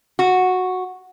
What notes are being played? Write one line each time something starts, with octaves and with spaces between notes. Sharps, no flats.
F#4